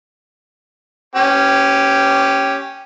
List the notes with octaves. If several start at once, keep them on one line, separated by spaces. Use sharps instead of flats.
C#4 G4